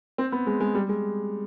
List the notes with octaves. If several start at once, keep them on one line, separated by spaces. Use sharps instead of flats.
C4
B3
G#3
G#3
G3
G#3